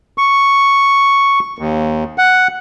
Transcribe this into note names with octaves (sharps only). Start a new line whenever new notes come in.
C#6
D#2
F#5